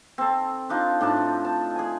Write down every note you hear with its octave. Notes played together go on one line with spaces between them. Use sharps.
C4 A4
D4 D#4 F4
A2 D4 D#4 A5
A5
G#4 G#5